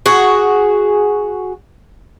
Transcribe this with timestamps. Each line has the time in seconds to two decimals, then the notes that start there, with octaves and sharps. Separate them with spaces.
0.06 F#4 G#4